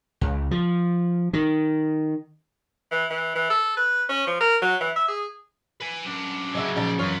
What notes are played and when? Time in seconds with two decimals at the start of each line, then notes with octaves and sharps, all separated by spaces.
0.21 C#2
0.51 F3
1.33 D#3
2.91 E3
3.10 E3
3.35 E3
3.50 A4
3.77 B4
4.09 C#4
4.27 F3
4.40 A#4
4.62 F#3
4.80 E3
4.96 E5
5.08 G#4
5.81 B4 G#5
6.05 F#2 D4
6.55 C#3 F#3 G#3 E5
6.76 A#2 F3 D#4 D5 G5 A5 A#5
6.99 F#2 E3 F4 B4 C#5